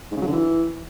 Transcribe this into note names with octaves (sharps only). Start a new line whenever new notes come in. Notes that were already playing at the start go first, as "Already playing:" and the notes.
G#2
C#3
F#3
D3
E3